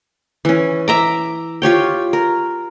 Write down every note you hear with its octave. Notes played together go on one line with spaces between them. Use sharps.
E3 C#4
E5 A#5 D6
F4 G4 C#5 G5
A#4